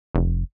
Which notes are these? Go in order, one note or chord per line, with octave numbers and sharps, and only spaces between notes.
F1